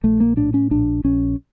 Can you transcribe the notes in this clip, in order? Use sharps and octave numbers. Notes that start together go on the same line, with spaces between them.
A#1 A3
A#3
A2 D4
C#4
A#1 D4
A#1 C#4